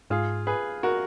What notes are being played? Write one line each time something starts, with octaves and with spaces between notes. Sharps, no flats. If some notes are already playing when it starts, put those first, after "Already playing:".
G#2 F4 G#4
G#4 B4
F#4 A#4